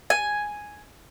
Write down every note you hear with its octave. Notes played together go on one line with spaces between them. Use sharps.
G#5